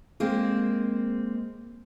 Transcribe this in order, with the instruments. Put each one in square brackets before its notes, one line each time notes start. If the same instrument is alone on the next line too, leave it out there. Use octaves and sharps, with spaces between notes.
[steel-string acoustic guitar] G#3 A#3 C4